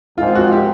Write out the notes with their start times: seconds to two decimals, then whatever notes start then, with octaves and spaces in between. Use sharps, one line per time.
0.17 G#1 G#2 F3 G#3 C4 F4
0.35 F#4
0.52 G4